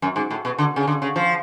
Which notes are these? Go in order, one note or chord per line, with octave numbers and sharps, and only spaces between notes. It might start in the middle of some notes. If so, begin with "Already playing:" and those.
F#2
G#2
A2
B2
D3
C#3
D3
C#3
F3